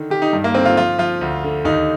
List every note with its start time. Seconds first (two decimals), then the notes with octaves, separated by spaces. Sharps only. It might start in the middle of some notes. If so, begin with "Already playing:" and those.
Already playing: D3 D#3
0.10 D#3 G4
0.22 D#4
0.33 G2
0.44 A#3
0.54 D3 C4
0.65 F4
0.77 F3 F4
0.98 F3 F4
1.21 D2
1.43 D3
1.65 D#2 D#4